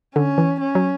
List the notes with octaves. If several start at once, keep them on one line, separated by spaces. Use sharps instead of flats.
D3 C#4
E3
C#4
F#3